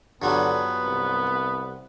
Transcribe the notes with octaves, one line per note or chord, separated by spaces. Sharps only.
G2 D3 F3 F#3 B3
C2